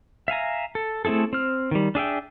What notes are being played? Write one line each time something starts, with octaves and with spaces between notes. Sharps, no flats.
E5 F5 G#5 A#5
A4
A3 C4 E4 G#4 A4
C4 F6
D#3 G3
D4 G#4 E5 G5